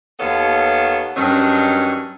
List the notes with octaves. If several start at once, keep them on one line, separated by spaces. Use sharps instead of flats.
D#2 B3 A4 C#5 F5
G2 D#3 F#3 C#4